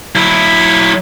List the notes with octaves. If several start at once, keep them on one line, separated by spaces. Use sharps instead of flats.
F#3 E4